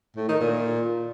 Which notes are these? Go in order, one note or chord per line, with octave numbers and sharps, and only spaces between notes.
A2
D#3
A#2